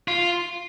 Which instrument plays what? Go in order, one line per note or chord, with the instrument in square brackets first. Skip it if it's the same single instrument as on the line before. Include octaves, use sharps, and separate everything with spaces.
[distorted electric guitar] F4